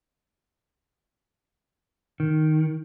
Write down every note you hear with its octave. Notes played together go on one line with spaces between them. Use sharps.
D#3